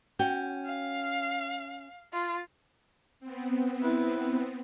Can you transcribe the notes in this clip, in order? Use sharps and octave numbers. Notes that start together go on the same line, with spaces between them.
C#4 F#4 G5
F5
F4
B3 C4
E4 B4